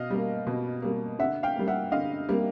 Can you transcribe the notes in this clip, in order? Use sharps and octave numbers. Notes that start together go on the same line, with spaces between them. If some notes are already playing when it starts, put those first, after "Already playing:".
Already playing: B2 D#5 F5
G3 A#3
B2
G3 A#3
D3 E5 F#5
F5 G5
G3 A#3
E5 F#5
D3 D#5 F5
G3 A#3